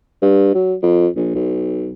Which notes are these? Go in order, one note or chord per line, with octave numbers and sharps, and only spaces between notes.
G2
F#3
F2
A#1
B1